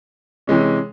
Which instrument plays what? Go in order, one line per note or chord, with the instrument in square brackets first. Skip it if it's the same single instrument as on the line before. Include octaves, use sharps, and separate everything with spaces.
[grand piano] C3 E3 G#3 C#4